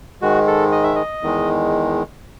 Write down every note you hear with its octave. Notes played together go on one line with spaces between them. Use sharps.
G#2 D#3 G#3 F#4
A4
D#5
E5
D#5
E2 D#3 G#3